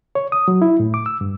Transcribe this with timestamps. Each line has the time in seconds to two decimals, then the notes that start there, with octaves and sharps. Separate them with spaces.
0.15 C#5
0.32 D#6
0.48 F#3
0.62 E4
0.80 A2
0.94 D6
1.06 E6
1.21 G2